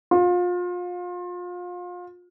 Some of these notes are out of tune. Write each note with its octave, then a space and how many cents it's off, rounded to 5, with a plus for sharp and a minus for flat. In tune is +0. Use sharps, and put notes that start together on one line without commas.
F4 +30